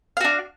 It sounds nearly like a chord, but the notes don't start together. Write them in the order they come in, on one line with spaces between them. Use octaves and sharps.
F5 F#4 D4